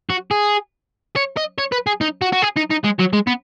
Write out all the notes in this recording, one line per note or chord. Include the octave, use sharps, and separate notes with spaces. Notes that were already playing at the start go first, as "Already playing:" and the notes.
F#4
G#4
C#5
D#5
C#5
B4
G#4
D#4
F#4
F#4
G#4
D#4
D#4
G#3
F#3
G#3
B3